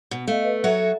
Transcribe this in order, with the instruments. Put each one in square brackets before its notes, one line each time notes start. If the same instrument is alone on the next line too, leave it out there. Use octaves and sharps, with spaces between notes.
[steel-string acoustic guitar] B2
[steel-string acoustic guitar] A3 [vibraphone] D#5 F5
[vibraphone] B4
[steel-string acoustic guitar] F#3 F#4 C#5 [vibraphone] A4 E5